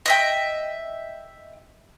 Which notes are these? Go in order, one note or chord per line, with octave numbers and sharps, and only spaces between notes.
D#5 E5 G5